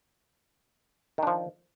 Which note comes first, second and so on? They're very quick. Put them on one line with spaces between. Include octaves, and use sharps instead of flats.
D#3 D4 F3